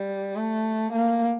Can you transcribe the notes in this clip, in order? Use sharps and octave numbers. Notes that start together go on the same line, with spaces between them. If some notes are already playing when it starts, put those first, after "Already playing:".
Already playing: G3
A3
A#3